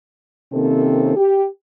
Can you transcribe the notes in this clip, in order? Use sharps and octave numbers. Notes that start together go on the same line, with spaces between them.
C3 D#3 A#3 C4 C#4 A4
G4